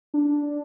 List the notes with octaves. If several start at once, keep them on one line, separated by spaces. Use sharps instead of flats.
D4